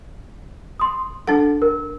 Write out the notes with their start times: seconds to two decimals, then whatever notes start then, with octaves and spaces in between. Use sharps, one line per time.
0.80 C6 D#6
1.27 D4 A4 F#5
1.62 A#4